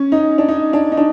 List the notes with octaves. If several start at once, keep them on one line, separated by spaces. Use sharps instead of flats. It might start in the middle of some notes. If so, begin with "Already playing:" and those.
Already playing: C#4
D#4
D4
D#4
D4
D#4
D4